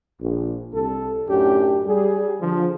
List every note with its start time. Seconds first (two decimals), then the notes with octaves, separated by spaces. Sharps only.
0.21 A#1
0.73 C2 A4
1.29 F#2 A2 D4 G4
1.86 G3 G#4
2.41 D3 F3